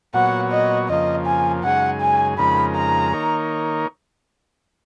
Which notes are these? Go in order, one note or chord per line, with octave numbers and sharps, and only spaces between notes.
A#2 F#3 B3 F#4 C#5 F#5
D#5
F2 C#3 F3 A#3 D#5
G#5
F#2 C#3 G#3 D#4 G#4 F#5
G#5
F2 C#3 G#3 D#4 A#4 B5
A#5
D#3 A#3 D#4 A#4 C#5